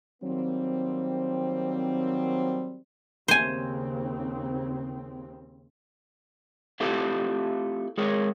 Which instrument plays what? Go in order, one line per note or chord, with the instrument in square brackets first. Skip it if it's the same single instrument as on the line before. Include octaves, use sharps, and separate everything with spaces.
[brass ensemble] D#3 F#3 G3 A#3 C4
[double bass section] D#2 C#3 C4 [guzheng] C5 G#5
[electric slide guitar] A3 C4 E4 F4 G4 A4
G#3 G#4 A#4 C#5